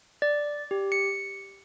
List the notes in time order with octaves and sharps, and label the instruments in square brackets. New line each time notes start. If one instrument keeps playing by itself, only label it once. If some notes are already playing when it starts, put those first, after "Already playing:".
[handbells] D5
G4
C#7